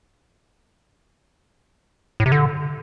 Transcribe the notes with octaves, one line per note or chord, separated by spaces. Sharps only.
A2
C3
D3